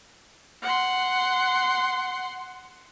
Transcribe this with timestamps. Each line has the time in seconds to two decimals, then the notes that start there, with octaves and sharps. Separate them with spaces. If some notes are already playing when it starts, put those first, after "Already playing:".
0.62 F#5 C6